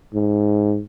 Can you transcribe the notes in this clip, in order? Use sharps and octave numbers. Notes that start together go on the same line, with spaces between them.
G#2